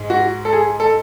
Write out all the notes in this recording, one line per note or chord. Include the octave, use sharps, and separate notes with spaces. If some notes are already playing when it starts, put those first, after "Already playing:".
Already playing: G#2 G#3
F#4
A4
G#4
A4